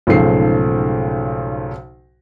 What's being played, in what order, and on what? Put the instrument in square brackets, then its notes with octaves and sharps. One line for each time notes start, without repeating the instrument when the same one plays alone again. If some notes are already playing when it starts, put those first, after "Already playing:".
[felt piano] B1 G#2 C#3 F3 A3 C7